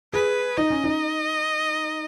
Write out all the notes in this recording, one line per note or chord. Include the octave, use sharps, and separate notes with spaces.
G#4 B4
D#4 D#5
C#4
D#4